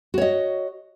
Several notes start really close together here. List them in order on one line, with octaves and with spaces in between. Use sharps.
F#4 C#5 D#5